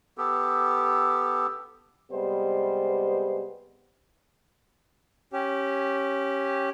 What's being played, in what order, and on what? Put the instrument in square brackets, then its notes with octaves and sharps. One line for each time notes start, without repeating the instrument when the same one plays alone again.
[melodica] B3 G4 A4
[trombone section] C3 G3 G#3 B3 C5
[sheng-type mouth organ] C#4 G4